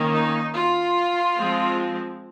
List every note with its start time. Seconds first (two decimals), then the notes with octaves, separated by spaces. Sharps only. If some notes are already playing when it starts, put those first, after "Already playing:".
Already playing: D#3 A#3 C#4
0.12 D#4
0.55 F4
1.38 F3 G#3 C4